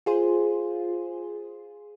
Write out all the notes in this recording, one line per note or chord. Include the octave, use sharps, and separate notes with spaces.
F4 G#4 C5